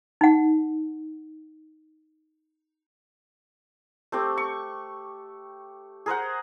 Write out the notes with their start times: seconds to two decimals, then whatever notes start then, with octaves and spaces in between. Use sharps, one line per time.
0.21 D#4 F#5
4.12 A3 C4 G4
4.37 C#6
6.06 G#4 A#4 C5 F#5